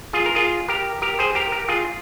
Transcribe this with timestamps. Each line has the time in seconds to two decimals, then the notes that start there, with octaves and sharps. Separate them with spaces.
0.13 F4 G#4
0.26 A#4
0.35 F4 G#4
0.68 G4 A#4
1.02 G4 A#4
1.19 G#4 C5
1.35 G4 A#4
1.52 G4 A#4
1.69 F4 G#4